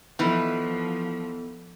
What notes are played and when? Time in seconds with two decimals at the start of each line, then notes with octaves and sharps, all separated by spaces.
0.19 E3 F3 B3 D#4 A4 B4